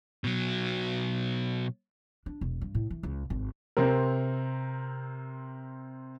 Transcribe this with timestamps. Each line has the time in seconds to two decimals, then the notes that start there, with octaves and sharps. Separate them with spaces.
0.24 B2 F#3
2.26 D4
2.41 E1
2.61 G2
2.75 A2
2.90 E3
3.03 C#2
3.30 G#1
3.77 C3 C4 A#4